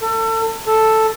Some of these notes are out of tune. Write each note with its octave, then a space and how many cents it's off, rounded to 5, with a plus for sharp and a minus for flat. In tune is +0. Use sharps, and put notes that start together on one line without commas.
A4 +30
A4 +0